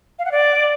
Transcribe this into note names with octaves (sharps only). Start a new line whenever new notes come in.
F5
F#5
D5